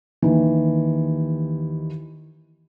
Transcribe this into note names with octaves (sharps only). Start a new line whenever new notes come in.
D#2 D#3 E3